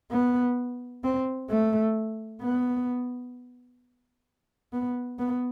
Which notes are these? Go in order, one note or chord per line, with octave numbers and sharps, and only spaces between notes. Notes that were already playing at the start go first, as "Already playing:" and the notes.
B3
C4
A3
B3
B3
B3